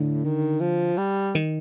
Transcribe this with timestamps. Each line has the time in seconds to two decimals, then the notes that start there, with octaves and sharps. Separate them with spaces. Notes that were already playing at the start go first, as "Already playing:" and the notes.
Already playing: A2 D3
0.24 D#3
0.60 F3
0.98 G3
1.35 D#3